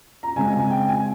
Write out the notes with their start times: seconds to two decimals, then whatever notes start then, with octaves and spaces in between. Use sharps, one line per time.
0.23 A#5
0.36 C#3 G#3 C4 G#5
0.53 G#5
0.71 G5
0.88 G#5